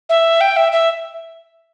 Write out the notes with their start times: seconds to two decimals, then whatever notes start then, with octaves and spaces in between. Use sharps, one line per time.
0.09 E5
0.41 G5
0.56 E5
0.72 E5